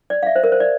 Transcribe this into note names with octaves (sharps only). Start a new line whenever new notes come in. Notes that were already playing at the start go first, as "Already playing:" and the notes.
D5
F5
E5
C5
A#4
C5
D5